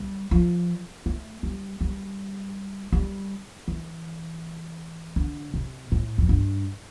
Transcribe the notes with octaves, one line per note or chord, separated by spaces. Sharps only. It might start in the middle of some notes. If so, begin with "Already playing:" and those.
Already playing: G3
F3
A3
G3
G3
G3
E3
D3
C3
A2
F2
G2